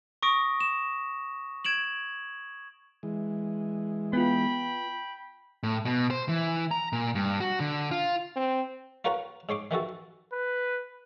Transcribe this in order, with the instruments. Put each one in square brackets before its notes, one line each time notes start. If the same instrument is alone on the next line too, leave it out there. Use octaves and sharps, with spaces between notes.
[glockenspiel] C#6 D#6 A#6 D7
E7
G#6 D7 E7 F#7
[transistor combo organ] E3 G#3
[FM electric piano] B3 F4 [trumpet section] G5 B5
[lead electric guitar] A2
B2
C5
E3
A#5
A#2
G2
F#4
D3
F4
[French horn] C4
[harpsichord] F4 A#4 B4 C#5 F#5 A#5
G#2 C#5 C6 D6
D#3 E3 F#4 A4
[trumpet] B4